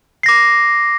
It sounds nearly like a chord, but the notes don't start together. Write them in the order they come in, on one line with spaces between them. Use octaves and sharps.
C7 A#6 D6